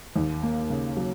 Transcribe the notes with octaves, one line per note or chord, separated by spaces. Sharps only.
D#2
A#3
C#3
F#3